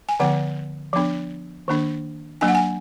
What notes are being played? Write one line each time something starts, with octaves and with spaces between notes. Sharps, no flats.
G#5
D3 F3 B3 F#5
F3 B3 D4
D#3 A#3 D4
F#3 A#3 D4 G#5
F#5
G#5